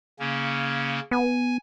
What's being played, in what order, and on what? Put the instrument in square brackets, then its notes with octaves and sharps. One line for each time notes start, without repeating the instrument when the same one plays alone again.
[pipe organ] C#3 A#3 C#4
[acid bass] B3 [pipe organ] G#5